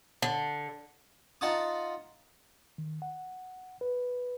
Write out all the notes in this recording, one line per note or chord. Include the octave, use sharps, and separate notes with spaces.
D3
D#4 F4 F#5 A5 D#6
D#3
F#5
B4